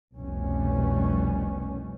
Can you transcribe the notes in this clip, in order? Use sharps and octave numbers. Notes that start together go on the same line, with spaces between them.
F1 C2 B2 G3 C#4